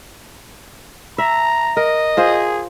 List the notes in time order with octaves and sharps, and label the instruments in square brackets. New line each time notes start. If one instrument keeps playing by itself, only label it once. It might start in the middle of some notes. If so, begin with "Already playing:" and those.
[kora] E5 [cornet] A#5
[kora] A#4 [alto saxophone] D#5
[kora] F4 C5 [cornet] G#4